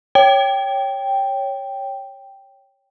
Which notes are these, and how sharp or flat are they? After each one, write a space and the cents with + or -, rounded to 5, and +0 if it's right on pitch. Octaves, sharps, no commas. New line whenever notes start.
C#5 +0 G5 +0